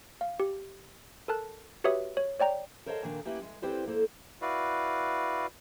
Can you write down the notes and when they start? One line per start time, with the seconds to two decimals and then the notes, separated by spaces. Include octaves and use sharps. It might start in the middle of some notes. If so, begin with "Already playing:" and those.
0.21 F5
0.40 G4
1.28 A4 A#4 A5 F#6
1.84 F#4 G4 B4 C#5 E5 D#6
2.17 C#5
2.40 C#5 D5 G5 A#5
2.86 A#4 C5 C#5 D#5 F5 A5
3.03 A#2 D#3 A#3 D4 F5
3.25 A#3 C#4 E4 G4 B4
3.42 G#3
3.62 C4 E4 G4 B4 C5 D5
3.87 A#3 A4 C5
4.42 E4 F#4 B4 D5 F5